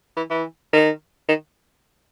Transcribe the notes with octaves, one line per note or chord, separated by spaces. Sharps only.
E3
E3
D#3
D#3